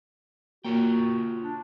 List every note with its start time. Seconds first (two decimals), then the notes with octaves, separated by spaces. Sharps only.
0.65 A#3 F4 F#4 C#5 G5
1.40 D4